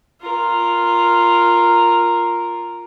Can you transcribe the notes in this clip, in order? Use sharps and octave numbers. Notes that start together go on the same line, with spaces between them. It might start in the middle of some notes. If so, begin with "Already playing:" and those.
F4 A#4